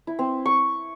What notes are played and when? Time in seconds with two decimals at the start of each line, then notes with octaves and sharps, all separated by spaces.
0.07 E4
0.19 C4
0.46 C#6